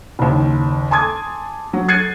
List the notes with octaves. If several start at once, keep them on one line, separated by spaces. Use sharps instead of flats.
F#1 D#2
G#5 A5 C6 D6 D#6 G#6
F#3
F#6 G#6 A6 C7 C#7 D#7